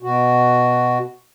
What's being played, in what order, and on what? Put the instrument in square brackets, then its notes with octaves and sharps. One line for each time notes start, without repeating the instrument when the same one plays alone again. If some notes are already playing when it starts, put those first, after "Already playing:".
[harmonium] B2 F#4